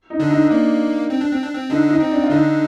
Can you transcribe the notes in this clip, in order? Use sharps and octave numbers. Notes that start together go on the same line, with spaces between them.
D#4
D3 D4
D#4
A#3 D4
C4
D4
C4
D4
C4
D3 D4 D#4
D#4
C4
D4
F4
D3 D4 D#4